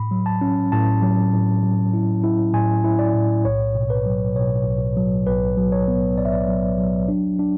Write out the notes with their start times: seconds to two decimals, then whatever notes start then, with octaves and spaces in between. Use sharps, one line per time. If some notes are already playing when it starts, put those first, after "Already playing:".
Already playing: A2 B5
0.11 F#3
0.26 A5
0.41 C#4
0.72 A2 A5
1.02 F#3
1.33 A2
1.63 F#3
1.93 E4
2.24 E4
2.54 A2 G#5
2.84 E4
2.99 D5
3.15 A2
3.45 B1 C#5
3.75 B2
3.90 B4
4.06 F#3
4.35 B2 C#5
4.66 B1
4.96 F#3
5.27 B1 B4
5.57 F#3
5.72 C#5
5.88 B3
6.18 B1 D5
6.25 E5
6.33 D5
6.48 F#3
6.78 F#3
7.08 D4
7.39 D4